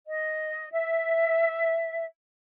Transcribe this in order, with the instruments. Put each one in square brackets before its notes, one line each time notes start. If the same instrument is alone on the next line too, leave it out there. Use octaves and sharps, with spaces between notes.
[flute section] D#5
E5